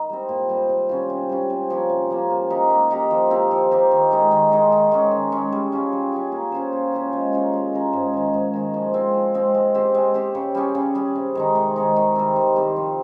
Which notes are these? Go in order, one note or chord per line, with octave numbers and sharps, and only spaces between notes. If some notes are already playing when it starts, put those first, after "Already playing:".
Already playing: D#4 A#4
G3 C4
A#2
G3 C4
C3
G3 C#4 F4
C3
G3 C#4 F4
C3
F3 A#3 C#4
C3
F3 A#3 C#4
A#3
D#4 G4 A#4
A#3
D#4 G4 A#4
F3
C4 G4 A#4
F3
C4 G4 A#4
D#3
G#3 D#4
D#3
G#3 D#4
D#3
G#3 C#4
D#3
G#3 C#4
G3
C#4 F4 G#4
G3
C#4 F4 G#4
A#3
C#4 F4 C5
A#3
C#4 F4 C5
G#3
C#4 F4 A#4
G#3
C#4 F4 A#4
G#2
D#3 G#3
G#2
D#3 G#3
F3
G#3 C4
F3
G#3 C4
G#3
C4 G4 C5
G#3
C4 G4 C5
C#3
G3 C#4 G#4
C#3
G3 C#4 G#4
C3
D#3 G#3 D#4
C3
D#3 G#3 D#4
D#3
G3 C4
D#3
G3 C4
F3